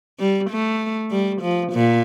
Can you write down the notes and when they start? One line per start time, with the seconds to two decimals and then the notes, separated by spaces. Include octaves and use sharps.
0.19 G3
0.50 A3
1.10 G3
1.42 F3
1.72 A#2